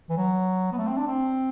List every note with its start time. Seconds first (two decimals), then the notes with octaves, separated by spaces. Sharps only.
0.09 E3
0.17 F#3
0.72 B3
0.78 A3
0.87 C4
0.97 D4
1.07 C4